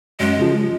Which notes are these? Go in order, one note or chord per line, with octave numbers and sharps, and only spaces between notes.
F#2 G#3
C#3 F3